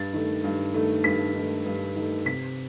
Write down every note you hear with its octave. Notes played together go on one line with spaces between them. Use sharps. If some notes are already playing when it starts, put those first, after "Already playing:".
Already playing: G2 A6
D#3 A3
G2
D#3 A3
G2 B6
D#3 A3
G2
D#3 A3
C3 B6